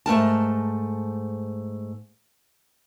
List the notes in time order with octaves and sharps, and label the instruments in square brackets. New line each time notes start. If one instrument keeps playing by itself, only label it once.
[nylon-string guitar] G#2 A3 A#4 A5